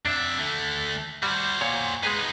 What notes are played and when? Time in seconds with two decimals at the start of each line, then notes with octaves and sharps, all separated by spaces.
0.05 F2 D4 E5
0.38 D3 A3
1.23 G3 F#4 C5
1.61 A#2 C#5
2.03 G#3 B3 D#4 G#4 B4